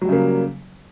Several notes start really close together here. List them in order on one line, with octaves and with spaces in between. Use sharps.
F#3 G3 C#3 A#3